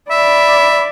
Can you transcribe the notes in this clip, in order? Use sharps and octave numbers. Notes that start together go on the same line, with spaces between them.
D5 E5 B5